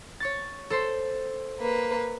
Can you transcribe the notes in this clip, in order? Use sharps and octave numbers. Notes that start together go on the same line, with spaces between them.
C#5 C#6 A6
A4 C5 C6
A#3 B4